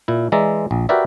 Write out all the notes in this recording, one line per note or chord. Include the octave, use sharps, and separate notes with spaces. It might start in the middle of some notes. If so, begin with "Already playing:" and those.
A#2 E4
E3 G#3 D5 E5 A#5
A#1
F#4 G4 A#4 B4 D5 E5